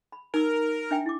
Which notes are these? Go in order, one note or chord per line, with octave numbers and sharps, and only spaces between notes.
B5
D#4 A#4 E6
D4 E5 G5
E4 D6